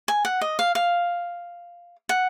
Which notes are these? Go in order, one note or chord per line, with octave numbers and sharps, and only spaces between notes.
G#5
F#5
D#5
F5
F5
F#5